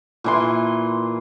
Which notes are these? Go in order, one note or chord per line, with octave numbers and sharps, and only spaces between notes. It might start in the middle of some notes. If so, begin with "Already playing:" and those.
A#2 E3 C6